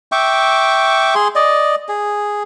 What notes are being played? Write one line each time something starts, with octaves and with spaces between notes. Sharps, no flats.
E5 G5 C#6 D6
G#4 C6
D5 D#5
G#4